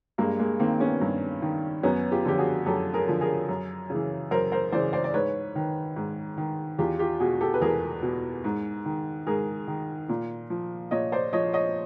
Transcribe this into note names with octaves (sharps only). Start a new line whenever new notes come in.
G2 G#3 A#3
G#3 A#3
D#3 A#3 C4
B3 C#4
G2
D#3
F#2 B3 C#4
F4 G4
D3 F3 G4
F#4 G#4
F#2 G4 A4
G#4 A#4
D3 F3
G#4 A#4
F#2
C#3 E3
F#2 A#4 C5
A#4 C5
C#3 E3 C5 D5
C5 D5
D5
G#2 B4 C#5
D#3
G#2
D#3
E2 F4 G4
F4 G4
B2 F#4 G#4
G4 A4
B4
E2 G#4 A#4
B2
G#2
D#3
G#2 G#4 A#4
D#3
A#2
F3
A#2 C#5 D#5
C5 D5
F3 C#5 D#5
C#5 D#5